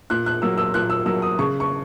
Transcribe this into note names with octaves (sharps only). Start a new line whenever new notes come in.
A#2 F#6
F#6
F#3 A#3 E6
E6
A#2 F#6
E6
F#3 A#3 E6
D#6
C#3 C#6
C#6